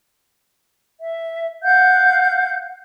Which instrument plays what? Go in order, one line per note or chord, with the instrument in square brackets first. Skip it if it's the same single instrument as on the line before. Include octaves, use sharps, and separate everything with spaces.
[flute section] E5
F5 F#5 G6